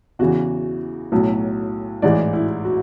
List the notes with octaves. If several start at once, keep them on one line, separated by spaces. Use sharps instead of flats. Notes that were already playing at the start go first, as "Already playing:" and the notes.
E2 C#3 E3 F#4
B1 A2 F#3
A1 G#2 E3 G#3 D5
E4
F#4